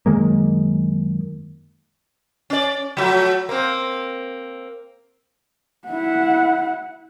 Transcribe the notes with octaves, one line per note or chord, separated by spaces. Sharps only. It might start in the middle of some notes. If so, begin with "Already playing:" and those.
F#2 D#3 G#3 A#3
C#4 D5
F3 F#3 A3
A#3 C4
E4 F#5